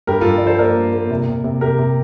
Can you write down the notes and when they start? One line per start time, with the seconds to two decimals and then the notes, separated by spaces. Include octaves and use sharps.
0.07 G2 G4 A#4
0.21 G2 F4 A4
0.38 D5
0.42 F3 A4 C5
0.59 A#3 A#4 D5
0.77 G2
0.93 A#3
1.10 C3
1.28 C3
1.44 C3
1.61 C3 G4 A#4
1.79 C3